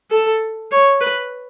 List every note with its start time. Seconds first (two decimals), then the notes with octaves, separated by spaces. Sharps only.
0.11 A4
0.71 C#5
1.01 B4